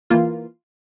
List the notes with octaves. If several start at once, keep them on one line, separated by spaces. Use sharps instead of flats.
E3 A#3 F4